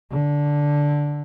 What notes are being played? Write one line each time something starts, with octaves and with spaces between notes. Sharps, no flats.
D3